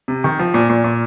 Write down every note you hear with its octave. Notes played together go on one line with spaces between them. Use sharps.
C3
D#3
F3
A#2
A#2
A#2